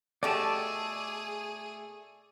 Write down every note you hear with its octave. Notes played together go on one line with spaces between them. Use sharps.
B2 A3 G4 G#4 D5 A5